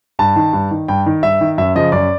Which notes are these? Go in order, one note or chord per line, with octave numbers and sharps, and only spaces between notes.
G2 A5
D#3
G2
D#3
G2 G5
D#3
G2 E5
D#3
F#2 E5
C#3 F3 D#5
F#2 D5